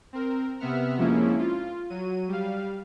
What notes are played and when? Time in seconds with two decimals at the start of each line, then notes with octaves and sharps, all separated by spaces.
0.13 C4 A#4
0.60 C3 B3 E5 F#5 F6
0.97 F2 G#2 F3 A#3 C#4 E4
1.39 F4
1.90 F#3 D#7
2.28 G3 F5